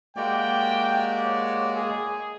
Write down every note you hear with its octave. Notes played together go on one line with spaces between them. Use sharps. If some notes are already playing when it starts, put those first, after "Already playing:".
G#3 A#3 F#4 G4 D5 G5
C#5
G#4